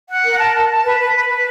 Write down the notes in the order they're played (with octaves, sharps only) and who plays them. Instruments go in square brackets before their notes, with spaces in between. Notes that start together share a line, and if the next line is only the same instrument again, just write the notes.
[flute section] F#5
A#4
A5
A5
A5
B4
B4
B4
B4